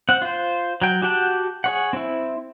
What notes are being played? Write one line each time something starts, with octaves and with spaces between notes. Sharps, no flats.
C4 F#5
F4 C5
F#3 G5
F#4 G4 F#5 G5 A5
G#4 C#5 F#5
C4 E4